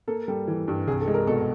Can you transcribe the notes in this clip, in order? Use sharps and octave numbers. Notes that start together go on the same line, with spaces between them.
A#3 A4
G3 A4
E3
G2
C2 G#4
A4
G#3
A#4
B2 A4